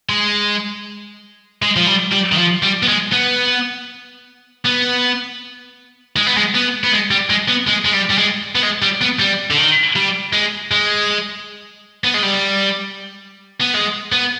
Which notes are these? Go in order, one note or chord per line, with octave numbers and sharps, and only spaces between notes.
G#3
G#3
F3
G3
G3
D#3
F3
G3
B3
G#3
B3
B3
G#3
B3
G#3
B3
B3
G#3
G3
G#3
B3
G#3
G#3
G3
G3
G#3
B3
G#3
G3
B3
G3
D3
D#3
G3
G#3
G#3
B3
G#3
G3
B3
G#3
B3